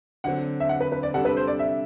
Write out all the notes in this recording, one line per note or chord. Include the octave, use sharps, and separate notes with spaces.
D3 F#3 C4 F#5
E5
F#5
B4
B4
D5
C3 G3 D4 A4 F#5
B4
C5
D5
E5